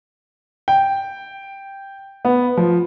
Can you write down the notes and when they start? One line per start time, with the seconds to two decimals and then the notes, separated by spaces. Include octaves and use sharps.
0.68 G5
2.25 B3
2.57 F3